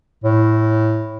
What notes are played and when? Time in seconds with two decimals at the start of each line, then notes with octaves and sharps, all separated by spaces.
0.24 A2